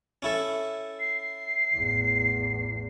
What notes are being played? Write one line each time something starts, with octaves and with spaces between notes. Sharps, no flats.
C#4 E4 A4
C7
A1 E2